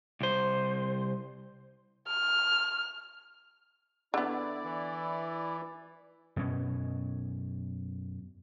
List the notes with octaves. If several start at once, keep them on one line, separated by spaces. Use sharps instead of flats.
C2 C5
F6
D3 B3 E4 D5
E3
F#2 B2 C#4